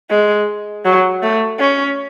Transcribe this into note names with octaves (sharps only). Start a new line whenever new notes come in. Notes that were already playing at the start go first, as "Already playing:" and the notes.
G#3
F#3
A3
C#4